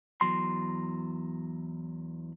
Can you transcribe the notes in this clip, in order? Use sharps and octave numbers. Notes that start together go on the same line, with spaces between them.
E2 F#3 C6